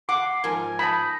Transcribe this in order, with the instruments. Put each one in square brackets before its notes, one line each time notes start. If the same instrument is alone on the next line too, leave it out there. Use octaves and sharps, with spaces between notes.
[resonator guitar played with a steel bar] F#5 [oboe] C6 [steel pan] D6
[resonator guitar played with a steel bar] G#2 F3 A#4 [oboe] G#5
[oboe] D#4 [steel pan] A5 B5